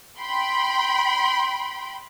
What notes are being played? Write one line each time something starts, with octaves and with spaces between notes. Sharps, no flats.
G5 B5 C6